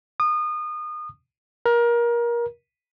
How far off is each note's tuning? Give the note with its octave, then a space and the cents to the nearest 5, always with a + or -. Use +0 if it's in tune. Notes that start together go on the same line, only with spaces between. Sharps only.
D#6 -30
A#4 +25